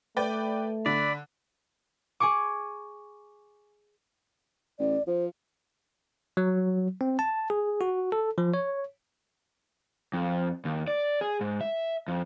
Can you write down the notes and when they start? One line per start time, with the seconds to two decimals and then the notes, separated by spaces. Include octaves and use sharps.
0.17 A3 B4 D5 G5
0.86 D3 D5 B5
2.20 G#4 G#5 C#6 D6
4.79 A1 D5
5.07 F3 C5
6.37 F#3
7.01 C4
7.19 A5
7.50 G#4
7.81 F#4
8.12 A4
8.38 F3
8.54 C#5
10.13 F2
10.65 D#2
10.88 D5
11.21 G#4
11.41 G#2
11.61 E5
12.08 F2